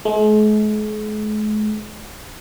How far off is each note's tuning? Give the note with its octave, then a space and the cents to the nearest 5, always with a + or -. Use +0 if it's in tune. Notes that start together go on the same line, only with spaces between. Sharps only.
G#3 +45